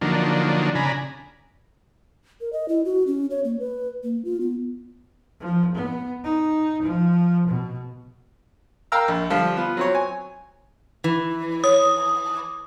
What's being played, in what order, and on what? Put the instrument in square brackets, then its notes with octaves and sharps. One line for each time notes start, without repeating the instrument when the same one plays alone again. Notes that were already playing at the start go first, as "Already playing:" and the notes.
[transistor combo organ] D3 F3 F#3 A#3 D4 D#4
C#3 D4 G#5 A#5 B5
[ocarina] A#4
D#5
E4
F#4
C#4
C#5
A#3
B4
A#3
F4
B3
[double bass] F3
B3
D#4
F3
B2
[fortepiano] A#4 F5 G5 A#5 E6 F6
A#1
D3 F3 G3 F4
B3 F4
F#3 C4 C#5
G#5
[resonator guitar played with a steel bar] E3
[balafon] C#5 [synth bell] D#6